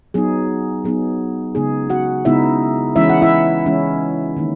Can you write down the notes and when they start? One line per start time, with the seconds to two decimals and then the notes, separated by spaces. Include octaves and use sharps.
0.14 F#3 B3 D#4 G#4
0.84 F#3 B3 D#4 G#4
1.55 C#3 G#3 B3 D#4 G#4
1.90 F#4 F#5
2.25 C#3 G#3 B3 D#4 E4 E5
2.96 E3 G#3 C#4 E4 E5
3.09 F#5
3.22 E4 E5
3.66 E3 G#3 C#4 E4
4.37 D#3 A#3 D#4